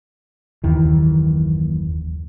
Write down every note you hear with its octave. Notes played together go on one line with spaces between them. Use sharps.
F#1 D#2 D#3 E3